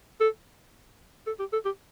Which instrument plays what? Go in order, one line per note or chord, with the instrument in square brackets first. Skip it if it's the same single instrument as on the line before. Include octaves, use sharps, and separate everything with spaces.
[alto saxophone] A4
A4
G4
A4
G4